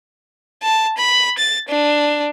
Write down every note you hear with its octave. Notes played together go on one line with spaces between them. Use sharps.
A5
B5
A6
D4